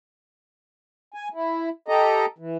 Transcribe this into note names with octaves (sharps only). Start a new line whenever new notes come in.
G#5
E4
G4 A4 D#5 A#5
E3